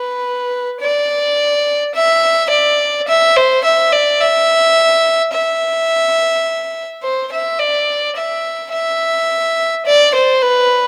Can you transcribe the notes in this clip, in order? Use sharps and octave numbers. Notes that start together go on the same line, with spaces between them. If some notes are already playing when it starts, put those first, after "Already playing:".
Already playing: B4
D5
E5
D5
E5
C5
E5
D5
E5
E5
C5
E5
D5
E5
E5
D5
C5
B4